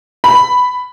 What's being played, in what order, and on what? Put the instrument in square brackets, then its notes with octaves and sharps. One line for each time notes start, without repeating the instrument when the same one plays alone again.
[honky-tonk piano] B5